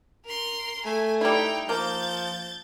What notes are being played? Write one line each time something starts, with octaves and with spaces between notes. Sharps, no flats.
A#4 C6
A3 G#5
G3 D#4 E4 G5
F3 A#3 G6 A6